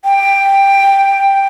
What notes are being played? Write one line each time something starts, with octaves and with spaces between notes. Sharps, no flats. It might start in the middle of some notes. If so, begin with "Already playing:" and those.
G5